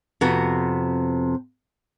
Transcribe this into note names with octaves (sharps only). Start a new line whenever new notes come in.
F2 C3 B3 F#4